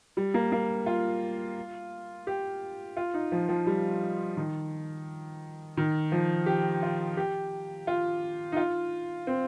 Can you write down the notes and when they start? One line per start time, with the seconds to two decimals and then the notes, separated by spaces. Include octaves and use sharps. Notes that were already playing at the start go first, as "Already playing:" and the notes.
0.17 G3
0.34 A#3
0.52 A#3
0.86 F4
2.27 G4
2.97 F4
3.14 D#4
3.32 F3
3.49 F3
3.67 G3
4.37 D#3
5.77 D#3
6.12 F3
6.46 G4
6.82 F4
7.17 G4
7.87 F4
8.52 D#4
8.56 F4
9.27 C4